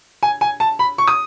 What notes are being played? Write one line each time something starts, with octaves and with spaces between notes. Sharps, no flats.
G#5
G#5
A5
B5
C#6
D#6